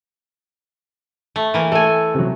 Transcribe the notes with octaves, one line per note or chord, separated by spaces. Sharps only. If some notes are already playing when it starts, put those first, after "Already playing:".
A3
E3 A#3
A3 A4 G#5
C3 F#3